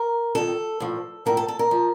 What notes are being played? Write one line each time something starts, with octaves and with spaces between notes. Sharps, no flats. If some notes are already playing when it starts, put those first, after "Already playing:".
Already playing: A#4
F2 D#3 A4
A2 F3
A2 F3 A#4
A4
A4
A#4
F3